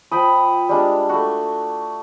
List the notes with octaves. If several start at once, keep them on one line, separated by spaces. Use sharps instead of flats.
F3 G5 B5 D#6
G3 G#3 D4
A3 F#4